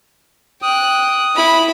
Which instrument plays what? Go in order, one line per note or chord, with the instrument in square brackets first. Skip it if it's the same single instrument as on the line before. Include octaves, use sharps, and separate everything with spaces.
[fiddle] G5 F#6 [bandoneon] D#6
[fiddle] E4 B5